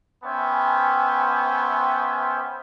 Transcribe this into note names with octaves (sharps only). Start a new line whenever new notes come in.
B3 C#4 C5 E5 G5 G#5